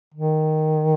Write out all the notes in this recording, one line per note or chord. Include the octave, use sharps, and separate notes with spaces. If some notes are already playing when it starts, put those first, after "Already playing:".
D#3